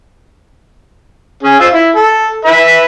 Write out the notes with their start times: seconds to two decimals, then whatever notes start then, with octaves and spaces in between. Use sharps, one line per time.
1.43 C#4 G#4
1.60 F4 C5 E6
1.74 E4
1.96 A4
2.45 B4 E5 B5